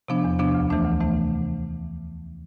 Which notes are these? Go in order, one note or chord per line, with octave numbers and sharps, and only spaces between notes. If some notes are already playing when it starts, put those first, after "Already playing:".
C3 F3 B3 D4
E2
C3 F3 B3 D4
D2
C3 E3 A3 D4
D2
C3 E3 A3 D4